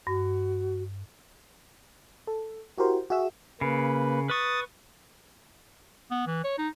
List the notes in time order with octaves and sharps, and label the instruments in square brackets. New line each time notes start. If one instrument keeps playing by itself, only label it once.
[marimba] G2 [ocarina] F#4
[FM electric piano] A4
E4 F#4 G4 A#4 C5
F#4 G#4 E5 E6
[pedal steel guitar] C#3 [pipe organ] A#3 B4
[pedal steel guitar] B4 C#6 [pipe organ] D#6 A6
[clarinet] B3
E3
C#5
D#4